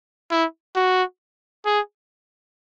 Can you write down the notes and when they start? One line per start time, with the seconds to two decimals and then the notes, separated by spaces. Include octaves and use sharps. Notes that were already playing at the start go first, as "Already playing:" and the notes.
0.31 E4
0.76 F#4
1.66 G#4